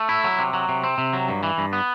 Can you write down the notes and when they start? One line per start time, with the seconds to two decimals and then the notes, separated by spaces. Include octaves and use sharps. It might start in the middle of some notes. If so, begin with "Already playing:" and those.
Already playing: A3
0.09 E4
0.24 F#3
0.39 C3
0.54 F#3
0.69 C3
0.84 C4
0.98 C3
1.13 F#3
1.29 G2
1.43 E3
1.58 G2
1.73 B3